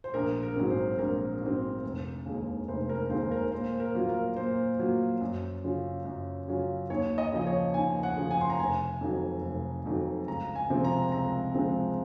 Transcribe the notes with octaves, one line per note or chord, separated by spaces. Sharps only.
C5
A#1 A#4
A#4
G#2 F#3 C4
C5
A#1 A#4
G#2 F#3 C4
F1
D#2 D#3 G#3
F1 C5
A#4
D#2 D#3 G#3 C5
A#4
A#2 C5
A#4
F#3 A#3 F4
A#4
A#2 C5
F#3 A#3 F4
F#2
C#3 F#3 C#4 F4
F#2
C#3 F#3 C#4 F4
D#2 C#5
D#5
C#3 F3 D#5
C#5
D#2 G#5
F#5
C#3 F3
G#5
C6
A#5
F1 G#5
F2 D#3 F#3
F1
F2 D#3 F#3
C#2 A#5
G#5
C3 F3 G#3 C4
A#5
C#2 A#5
C3 F3 G#3 C4